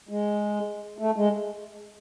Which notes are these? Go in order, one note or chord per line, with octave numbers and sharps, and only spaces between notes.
G#3
A3
G#3